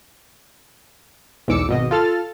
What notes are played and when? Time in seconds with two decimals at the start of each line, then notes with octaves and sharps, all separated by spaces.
1.48 B1 E2 G#2 D6 E6 C#7
1.68 G#1 B2 D#5
1.91 F4 A4 F6 A6